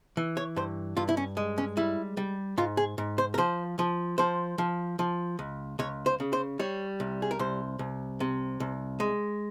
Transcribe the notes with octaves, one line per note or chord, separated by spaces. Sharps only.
E3
C#5
G2 C5
G2 F4
E4
C#4
G#3
C#4
G3 E4
G3
G#2 F4
G#4
G#2
C5
A#4
F3 C5
F3
F3 C5
F3
F3
C#2
C#2 C#5
C5
C#3
C5
G3 C#5
C2
G#4
A#4
C2 C5
C2
C3
C2
G#3